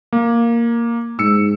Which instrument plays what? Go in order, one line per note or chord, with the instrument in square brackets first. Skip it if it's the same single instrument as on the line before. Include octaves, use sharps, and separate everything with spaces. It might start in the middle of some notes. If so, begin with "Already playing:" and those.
[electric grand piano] A#3
[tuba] G#2 [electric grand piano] E6 C#7